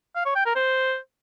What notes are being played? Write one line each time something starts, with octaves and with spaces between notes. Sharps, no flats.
F5
C#5
G5
A#4
C5